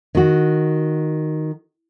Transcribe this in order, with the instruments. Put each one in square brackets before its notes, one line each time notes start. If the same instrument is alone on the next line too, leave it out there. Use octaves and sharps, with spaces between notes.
[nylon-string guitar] D#3 F#4